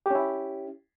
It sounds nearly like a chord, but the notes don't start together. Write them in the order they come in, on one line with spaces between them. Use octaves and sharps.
G4 C#4 E4